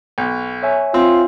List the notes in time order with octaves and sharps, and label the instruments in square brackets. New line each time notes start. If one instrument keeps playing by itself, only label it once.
[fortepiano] B1
[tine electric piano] C#5 E5 G#5
[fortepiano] C4 [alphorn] F4